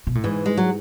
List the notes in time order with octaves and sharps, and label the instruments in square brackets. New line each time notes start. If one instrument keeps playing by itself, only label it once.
[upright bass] B2
A2
[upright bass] G#2 [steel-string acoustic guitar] E3
[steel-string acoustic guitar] G#3
F#3